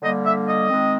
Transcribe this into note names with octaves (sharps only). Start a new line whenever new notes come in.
D3 G3 A#3 D#5
E5
D#5
D#3 G#3 C4